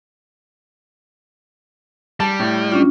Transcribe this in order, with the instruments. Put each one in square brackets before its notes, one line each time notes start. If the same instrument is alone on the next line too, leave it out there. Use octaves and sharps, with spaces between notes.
[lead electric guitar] G3 [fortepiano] A5
[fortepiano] A2
[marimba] C#4 D4 F4